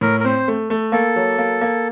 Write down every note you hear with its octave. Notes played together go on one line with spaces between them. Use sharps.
A2 A#4
A#4
C4 C5
A3
A3
A#3 A4
F#3
A#3
A#3